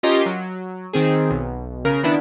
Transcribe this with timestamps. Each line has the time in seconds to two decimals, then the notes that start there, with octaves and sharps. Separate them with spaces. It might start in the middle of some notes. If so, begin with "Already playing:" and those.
0.03 C#4 F4 G4 A#4 D#5 C6
0.26 F#3
0.93 D#3 C4 G#4
1.30 B1
1.85 C#3 A#4
2.03 D#3 B3 D4 E4